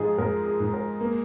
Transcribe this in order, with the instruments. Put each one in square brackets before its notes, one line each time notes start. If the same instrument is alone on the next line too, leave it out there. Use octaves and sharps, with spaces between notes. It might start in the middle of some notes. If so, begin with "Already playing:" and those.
Already playing: [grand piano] G#2 F4 [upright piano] F3 G#3 G#4
[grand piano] G#2 [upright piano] A#4
[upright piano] G#4
[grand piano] G#2
[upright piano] A#4
[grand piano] A#3